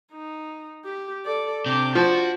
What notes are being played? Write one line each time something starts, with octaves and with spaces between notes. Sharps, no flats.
D#4
G4
A4 D5
C3 D4 D6 G6
F3 F#4 A5